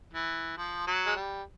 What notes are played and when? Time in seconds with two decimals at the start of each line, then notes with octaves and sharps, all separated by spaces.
0.13 E3
0.58 F3
0.87 F#3
1.06 G#3
1.16 G3